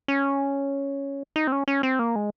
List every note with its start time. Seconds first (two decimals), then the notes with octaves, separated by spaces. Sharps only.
0.08 C#4
1.36 D#4
1.47 C4
1.52 C#4
1.68 C#4
1.83 C4
1.99 A#3
2.16 G#3